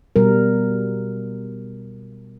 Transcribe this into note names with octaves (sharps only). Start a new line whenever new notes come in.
B2 G3 A#4